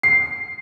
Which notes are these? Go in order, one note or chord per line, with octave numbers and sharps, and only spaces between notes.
C7